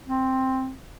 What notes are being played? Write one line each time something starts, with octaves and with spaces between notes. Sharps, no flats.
C4